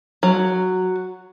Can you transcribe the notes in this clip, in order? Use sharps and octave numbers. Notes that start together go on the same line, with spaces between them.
F#3